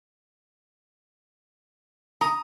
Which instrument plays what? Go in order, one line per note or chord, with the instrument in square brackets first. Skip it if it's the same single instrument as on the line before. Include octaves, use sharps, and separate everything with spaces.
[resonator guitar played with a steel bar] A#5 [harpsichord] D#6